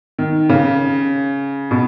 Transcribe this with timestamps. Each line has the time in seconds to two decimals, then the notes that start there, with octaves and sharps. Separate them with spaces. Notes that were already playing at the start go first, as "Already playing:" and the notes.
0.19 D#3
0.49 C#3
1.71 B2